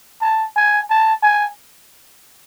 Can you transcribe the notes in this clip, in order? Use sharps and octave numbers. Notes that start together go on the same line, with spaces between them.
A5
G#5
A5
G#5